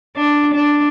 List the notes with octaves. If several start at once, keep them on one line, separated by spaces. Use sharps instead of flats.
D4
D4